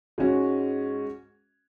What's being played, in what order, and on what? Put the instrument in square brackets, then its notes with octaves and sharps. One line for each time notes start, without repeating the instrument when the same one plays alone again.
[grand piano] G#2 G#3 C#4 F#4